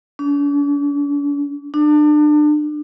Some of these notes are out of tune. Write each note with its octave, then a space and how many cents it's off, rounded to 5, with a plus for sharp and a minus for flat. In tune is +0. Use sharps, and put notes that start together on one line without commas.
D4 -45
D4 +30